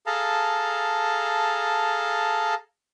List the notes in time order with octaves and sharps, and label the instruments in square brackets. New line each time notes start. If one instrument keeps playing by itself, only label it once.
[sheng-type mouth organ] G#4 A4 F5 A5 A#5